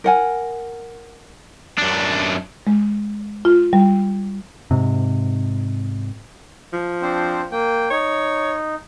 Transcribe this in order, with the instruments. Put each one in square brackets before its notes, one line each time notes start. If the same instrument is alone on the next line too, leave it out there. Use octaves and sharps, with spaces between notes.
[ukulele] A#4 F#5 G#5
[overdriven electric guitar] F#2 D4
[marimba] G#3
F4
G3
[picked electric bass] G#2 C3
[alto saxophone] F3
[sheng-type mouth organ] C4 D4 C5
A#3 G5
[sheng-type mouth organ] D#4 [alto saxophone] C#5